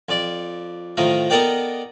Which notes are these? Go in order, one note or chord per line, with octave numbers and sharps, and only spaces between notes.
F2 D5
A2 D#3 F3 D#4
B3 D#4 A4 A#4 D5 G5